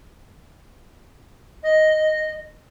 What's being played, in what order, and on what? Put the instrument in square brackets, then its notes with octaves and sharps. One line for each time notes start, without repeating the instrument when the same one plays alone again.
[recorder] D#5